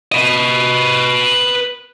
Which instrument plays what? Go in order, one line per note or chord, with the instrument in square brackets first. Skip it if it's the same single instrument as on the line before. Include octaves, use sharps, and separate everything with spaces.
[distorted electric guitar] B4 D#5